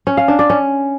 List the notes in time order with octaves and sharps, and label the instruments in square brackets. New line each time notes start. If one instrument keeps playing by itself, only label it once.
[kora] C#4
F5
D4
D5
C#4